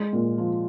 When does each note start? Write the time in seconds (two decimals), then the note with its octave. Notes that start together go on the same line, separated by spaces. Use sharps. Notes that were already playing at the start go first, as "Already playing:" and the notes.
Already playing: G#3
0.13 A#2
0.38 F3